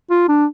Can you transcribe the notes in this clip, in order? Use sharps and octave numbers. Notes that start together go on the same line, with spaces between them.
F4
D4